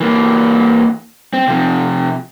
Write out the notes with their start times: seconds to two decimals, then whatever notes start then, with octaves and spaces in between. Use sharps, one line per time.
0.01 E3 A#3
1.33 C4
1.48 C3 F3